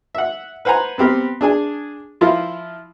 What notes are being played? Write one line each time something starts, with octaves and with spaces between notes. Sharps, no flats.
E5 F#5
B4 C5 F#5 G#5 A#5
B3 C4 G4 A#4
D4 G#4 G#5
F3 E4 F4 A#4